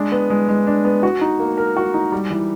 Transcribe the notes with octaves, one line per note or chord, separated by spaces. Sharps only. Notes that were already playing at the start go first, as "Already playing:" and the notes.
Already playing: G#3 D4
B3
G#3
G#3
D4
B3
F#4
D#4
A#3
A#4
F#4
D#4
G3
E3